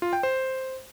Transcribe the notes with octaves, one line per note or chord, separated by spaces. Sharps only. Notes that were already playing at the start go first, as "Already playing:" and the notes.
F4
G5
C5